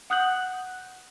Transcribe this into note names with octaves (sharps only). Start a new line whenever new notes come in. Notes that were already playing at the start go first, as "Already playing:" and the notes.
F#5 D#6 F#6 G6 F#7